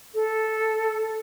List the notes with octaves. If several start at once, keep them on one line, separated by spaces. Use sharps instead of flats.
A4